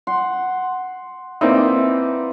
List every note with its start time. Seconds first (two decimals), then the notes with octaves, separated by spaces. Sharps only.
0.07 F#5 C6
1.41 E3 A#3 C4 D#4 D5 E5